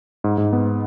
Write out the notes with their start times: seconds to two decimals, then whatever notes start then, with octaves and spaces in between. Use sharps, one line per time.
0.24 G#2
0.38 G#2
0.53 B3